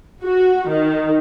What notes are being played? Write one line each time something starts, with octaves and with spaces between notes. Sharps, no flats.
F#4
D#3